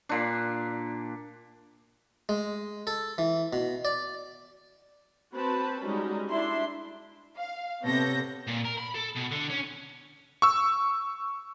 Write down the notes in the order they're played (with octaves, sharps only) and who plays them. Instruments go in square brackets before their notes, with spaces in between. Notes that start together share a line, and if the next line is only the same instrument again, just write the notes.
[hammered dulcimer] A#2 D4
[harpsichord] G#3
A4
E3
B2
D5
[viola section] C4 F#4 B4 C5 A5 B5
G3 G#3 C#4 D#4 F#4
D4 E4 E5 C6
[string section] F5
C3 B3 A4 C#5 G6 A#6
[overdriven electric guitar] A#2
A#4
B5
A4
B2
D3
C#4
[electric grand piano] C#6 E6